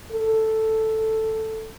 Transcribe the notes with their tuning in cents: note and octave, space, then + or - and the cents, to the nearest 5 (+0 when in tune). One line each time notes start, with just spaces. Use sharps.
A4 +5